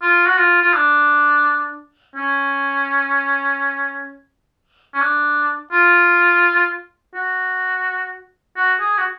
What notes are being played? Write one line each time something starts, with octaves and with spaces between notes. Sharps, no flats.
F4
F#4
F4
F4
D4
C#4
C#4
D4
F4
F#4
F#4
G#4
F#4